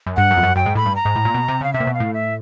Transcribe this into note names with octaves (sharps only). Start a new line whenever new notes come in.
F#2
G2 F#5
F#2
F2
F#2
F#2 G5
G#2
A2 B5
G2
A#5
G#2
A2
A#2
B2
C3
C#3 F5
C3 E5
A#2
B2
F5
A2
E5